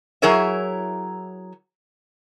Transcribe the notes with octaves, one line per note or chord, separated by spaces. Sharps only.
F#3 E4 G#4 A#4 C#5 E5